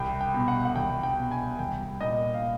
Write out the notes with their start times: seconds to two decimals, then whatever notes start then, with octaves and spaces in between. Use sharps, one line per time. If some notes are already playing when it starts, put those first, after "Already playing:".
Already playing: C2 G5
0.21 G5
0.34 B2
0.48 F#5
0.65 F#5
0.76 C2 G5
1.03 G5
1.18 B2
1.31 G#5
1.59 C2 G5
2.01 A#2 D#5
2.34 F5